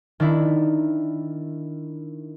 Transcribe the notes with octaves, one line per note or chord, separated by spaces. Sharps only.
D#3 D4 E4